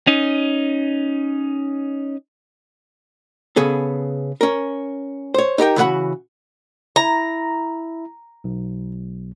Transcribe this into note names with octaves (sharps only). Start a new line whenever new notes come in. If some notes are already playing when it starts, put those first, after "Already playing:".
C#4 D#4
C#3 B3 G#4 A4
C#4 A#4
C5 C#5
D#4 G4 A#4 G5
C#3 E3 F#4 A4 F#5 B5
E4 A#5
B1